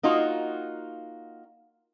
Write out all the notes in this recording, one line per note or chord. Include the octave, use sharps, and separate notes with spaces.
A#3 D#4 F4 F#4